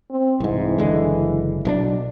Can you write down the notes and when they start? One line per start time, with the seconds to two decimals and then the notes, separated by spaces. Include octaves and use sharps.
0.10 C4
0.40 C2 G#2 E3
0.78 F#1 D3 G#3
1.65 B1 B2 E3 D4